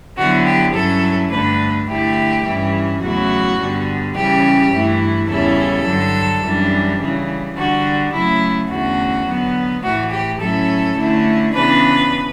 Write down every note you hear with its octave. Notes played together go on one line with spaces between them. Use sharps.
D3 F#3 B3 E4 F#4
G4
G2 F#3 C#4 E4 A4
G2 D3 A3 D4 B4
D3 A3 E4 G4
G2 E3 G3 C#4 E4
E2 C#3 F#3 A3 E4 F#4
G2 D3 G3 B3
C#3 E3 G3 C#4 G4
G2 E3 A3 E4
E2 C#3 G3 C#4 E4 A4
G2 D3 F#3
F#2 E3 G3 D4
C#3 E3 G3
D3 G3 D4 F#4
C#3 F#3 A3 E4
E2 D3 A3 C#4 F#4
D3 F#3 B3
A2 E3 A3 F#4
G4
A2 F#3 C#4 E4 A4
D3 A3 C#4 E4
C#3 E3 B3 D4 B4